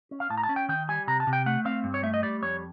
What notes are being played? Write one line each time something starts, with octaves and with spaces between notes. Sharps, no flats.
C#4
F5
A2 A5
A#5
A5
C#4
G5
D#3 G5
G3 G#5
C3 A#5
A5
C3
G5
A3 F#5
C4 F5
G2
C#5
A3 E5
D#5
G3 D5
F2 C#5